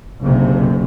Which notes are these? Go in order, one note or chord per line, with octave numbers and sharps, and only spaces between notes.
F#1 B1 C3